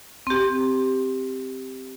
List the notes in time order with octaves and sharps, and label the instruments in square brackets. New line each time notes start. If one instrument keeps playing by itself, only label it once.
[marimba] C4 G4